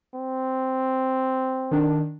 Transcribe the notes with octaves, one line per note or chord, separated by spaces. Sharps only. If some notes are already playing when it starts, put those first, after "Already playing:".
C4
D#3 D4